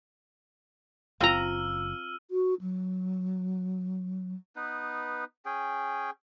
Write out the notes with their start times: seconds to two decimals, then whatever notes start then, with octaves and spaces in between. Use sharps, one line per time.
1.21 F#1 C4 F4 F5 A#5 E6 F6 D#7
2.31 F#4
2.61 F#3
4.56 B3 D#4 B4
5.45 C#4 G#4 G5